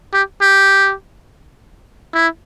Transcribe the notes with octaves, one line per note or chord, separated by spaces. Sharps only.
G4
G4
E4